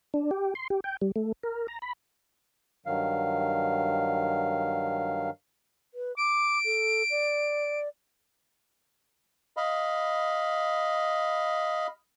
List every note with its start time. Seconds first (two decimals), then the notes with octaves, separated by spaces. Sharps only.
0.14 D4
0.31 G4
0.55 C6
0.70 G4
0.84 G5
1.02 G3
1.16 A3
1.43 A#4
1.68 A#5
1.82 B5
2.86 G2 D#3 F#3 F5
5.94 B4
6.17 D6 D7
6.65 A4
7.10 D5
9.57 D#5 F5 B5